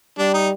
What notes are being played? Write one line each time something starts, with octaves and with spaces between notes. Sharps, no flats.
G3 D4
D#4